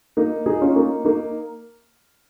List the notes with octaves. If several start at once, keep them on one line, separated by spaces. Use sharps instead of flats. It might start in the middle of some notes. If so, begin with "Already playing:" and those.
A#3 D#4
D#4 G#4
C#4 F4
A#3 D#4
A#3 D#4